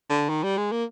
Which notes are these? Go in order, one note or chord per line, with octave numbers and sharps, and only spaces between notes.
D3
D#3
G3
G#3
A#3